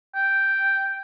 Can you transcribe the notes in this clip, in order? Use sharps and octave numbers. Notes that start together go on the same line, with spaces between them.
G5